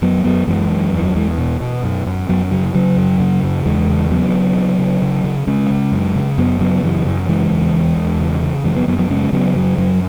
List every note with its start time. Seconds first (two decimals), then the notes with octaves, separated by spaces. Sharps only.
0.02 F#2 F#3 B3
0.24 F#2 F#3 B3
0.47 F#2 E3 G#3
0.71 F#2
0.92 E2 E3
1.05 F#3
1.15 E2 E3 G#3
1.38 B2
1.61 B2
1.84 F#2
2.06 F#2
2.29 F#2 F#3 B3
2.51 C#3 F#3
2.74 C#3 F#3
2.97 F#2
3.20 C#3
3.43 F#2
3.65 E2 E3 G#3
3.89 C#3
4.11 C#3 F#3 B3
4.33 C#3
4.57 C#3
4.79 C#3
5.02 C#3
5.24 C#3
5.47 C#3 G#3 C#4
5.70 C#3
5.92 F#2
6.15 C#3
6.38 F#2 F#3 B3
6.61 C#3 F#3 B3
6.83 F#2 E3
7.06 F#2 F#3
7.28 C#3 E3 G#3
7.51 E2
7.74 E2
7.97 E2
8.20 C#3
8.42 C#3
8.64 F#2 E3 G#3
8.76 F#3 B3
8.87 F#2 F#3 B3
8.99 F#3 B3
9.10 C#3 G#3 C#4
9.33 C#3 F#3 B3
9.56 F#2 F#3
9.78 F#2 F#3